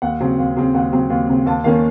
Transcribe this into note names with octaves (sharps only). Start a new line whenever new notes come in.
D#2 F#5
C#3 F#3 C4
D#2
C#3 F#3 C4
D#2 F#5
C#3 F#3 C4
D#2
C#3 F#3 C4
D#2 A5
D#3 A#3 C#4 F5